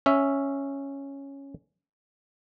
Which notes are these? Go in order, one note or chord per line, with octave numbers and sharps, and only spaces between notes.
C#4 E5